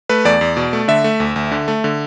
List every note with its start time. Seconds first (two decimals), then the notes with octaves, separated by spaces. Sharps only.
0.09 A3 B4
0.25 E2 D5
0.41 E2
0.57 B2
0.73 A3
0.88 D3 E5
1.04 A3
1.20 D2
1.36 D2
1.51 D3
1.68 A3
1.84 D3